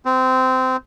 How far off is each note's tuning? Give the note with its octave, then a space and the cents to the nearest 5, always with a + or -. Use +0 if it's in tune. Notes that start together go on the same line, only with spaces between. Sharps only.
C4 -20